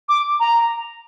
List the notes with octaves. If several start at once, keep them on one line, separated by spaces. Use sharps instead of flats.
D6
A#5